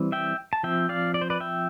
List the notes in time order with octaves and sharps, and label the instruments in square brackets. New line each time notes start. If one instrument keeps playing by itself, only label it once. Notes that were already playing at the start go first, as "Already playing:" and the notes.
Already playing: [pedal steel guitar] E3 G3 C4
E5 G5
A5
F3 C4 E5 G5
D5 F5
D5
C5
B4 D5
E5 G5